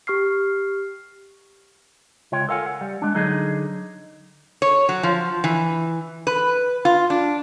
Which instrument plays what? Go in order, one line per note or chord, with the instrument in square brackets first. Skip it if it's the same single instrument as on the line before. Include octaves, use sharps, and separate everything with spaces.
[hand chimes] G4 C#6 F6 C7
[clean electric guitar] C#2 F4 C#5 G5
A4 A#4 F5 F#5 G#5
F#5
G3
G#3 D4
D3 F#3 D#4 G#4 D#5
[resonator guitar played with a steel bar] C#5
F#3
F3
E3
B4
F4
D4